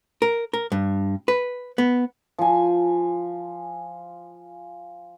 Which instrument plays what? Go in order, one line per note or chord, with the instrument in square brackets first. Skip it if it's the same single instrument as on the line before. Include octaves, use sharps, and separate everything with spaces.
[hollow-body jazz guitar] A#4
A#4
G2
B4
B3
[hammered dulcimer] F3 G#5